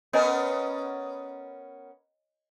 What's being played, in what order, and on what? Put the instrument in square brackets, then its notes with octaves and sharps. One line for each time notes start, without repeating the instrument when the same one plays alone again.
[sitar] B3 C#4 A#4 [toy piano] C#5 D#5 G#5